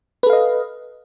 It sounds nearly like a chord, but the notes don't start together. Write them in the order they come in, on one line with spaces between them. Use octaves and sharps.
B4 A4 F5 D#5